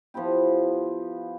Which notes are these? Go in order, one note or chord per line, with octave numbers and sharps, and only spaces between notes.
F3 B3 E4 G4